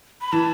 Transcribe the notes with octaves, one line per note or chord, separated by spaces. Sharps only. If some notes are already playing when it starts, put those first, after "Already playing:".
B5
E3 A5